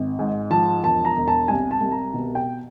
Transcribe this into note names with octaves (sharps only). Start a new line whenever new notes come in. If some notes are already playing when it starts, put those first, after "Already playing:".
Already playing: G#1
G#2
F3 A5
E1 A5
A#5
E1
A5
C2 G#5
A5
C2
A#5
B2
G5